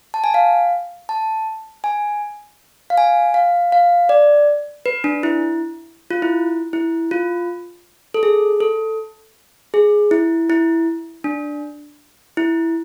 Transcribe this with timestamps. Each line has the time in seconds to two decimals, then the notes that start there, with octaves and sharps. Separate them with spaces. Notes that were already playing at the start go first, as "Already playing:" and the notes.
0.14 A5
0.24 G#5
0.34 F5
1.09 A5
1.84 G#5
2.90 F5
2.97 G#5
3.34 F5
3.72 F5
4.09 D5
4.86 B4
5.04 D4
5.23 E4
6.10 F4
6.22 E4
6.73 E4
7.11 F4
8.14 A4
8.23 G#4
8.60 A4
9.74 G#4
10.11 E4
10.50 E4
11.24 D4
12.37 E4